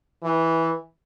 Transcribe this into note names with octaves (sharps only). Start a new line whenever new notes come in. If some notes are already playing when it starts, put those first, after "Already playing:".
E3